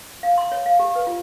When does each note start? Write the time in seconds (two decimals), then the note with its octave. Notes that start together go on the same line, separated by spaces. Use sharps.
0.23 F5
0.38 C6
0.52 C#5
0.66 F5
0.79 G4
0.95 B4
1.07 F4